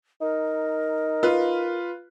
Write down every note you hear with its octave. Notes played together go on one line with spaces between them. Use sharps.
D#4 A#4
F4 B4